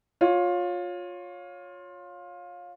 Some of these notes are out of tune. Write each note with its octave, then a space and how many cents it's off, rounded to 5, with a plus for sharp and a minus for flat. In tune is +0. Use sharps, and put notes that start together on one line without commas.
F4 +20 C#5 +0